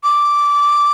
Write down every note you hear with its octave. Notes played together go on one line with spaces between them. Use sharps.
D6